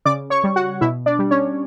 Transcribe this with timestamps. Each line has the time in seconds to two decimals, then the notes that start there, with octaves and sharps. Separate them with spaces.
0.05 C#3 D5 D6
0.30 C#5 C#6
0.44 G3
0.56 F#4 F#5
0.81 B2 E4 E5
1.06 D4 D5
1.19 G3
1.31 C#4 C#5